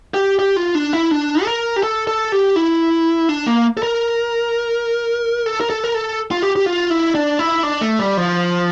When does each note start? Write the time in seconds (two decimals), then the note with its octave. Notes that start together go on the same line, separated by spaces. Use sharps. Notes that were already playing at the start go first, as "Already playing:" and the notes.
0.14 G4
0.39 G4
0.56 F4
0.75 D4
0.93 E4
1.11 D4
1.43 A4
1.47 A#4
1.76 G4
1.83 A4
2.07 A4
2.32 G4
2.56 E4
3.29 D4
3.47 A#3
3.77 A4
3.83 A#4
5.46 A4
5.60 A#4
5.70 A4
5.84 A#4
5.94 A4
6.31 F4
6.42 G4
6.56 G4
6.66 F4
6.90 E4
7.15 D4
7.39 E4
7.63 D4
7.81 A3
7.99 G3
8.17 F3